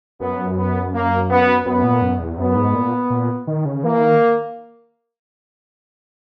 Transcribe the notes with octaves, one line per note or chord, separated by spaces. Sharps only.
F#2 B3
B3
A#3
B3
F#2 B3
A#2
F#2
E2
F#2 B3
G#2
A#2
A#2
D#3
C#3
E3 A#3
D#3